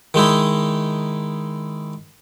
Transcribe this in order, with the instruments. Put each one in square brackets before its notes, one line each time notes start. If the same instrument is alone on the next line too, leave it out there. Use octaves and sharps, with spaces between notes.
[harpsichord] D#3 G#3 D#4 E4